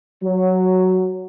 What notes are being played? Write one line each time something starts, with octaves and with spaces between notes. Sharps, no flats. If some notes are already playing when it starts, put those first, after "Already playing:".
F#3